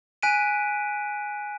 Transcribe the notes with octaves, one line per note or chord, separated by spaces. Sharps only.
G#5 F#6 B6 D7 D#7